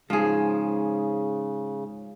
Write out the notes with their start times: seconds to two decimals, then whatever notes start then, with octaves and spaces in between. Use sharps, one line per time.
0.10 G#2 C#3 F3 G#4